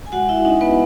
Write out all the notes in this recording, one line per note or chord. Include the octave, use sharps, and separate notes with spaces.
G#5
G#3 F#4 F#5
E4 E5
C#4 D#4 F#4 D#5
B3 B4